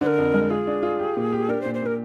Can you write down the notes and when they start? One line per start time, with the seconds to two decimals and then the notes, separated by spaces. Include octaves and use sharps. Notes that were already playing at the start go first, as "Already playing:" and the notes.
0.01 D3 C5
0.06 A#4
0.18 F2
0.34 G#3
0.50 F4 G#4
0.67 D4
0.83 F4
0.99 G4
1.17 A#2
1.33 G4
1.48 D4 A#4
1.61 C5
1.65 A#2
1.74 C5
1.82 A#2 A#4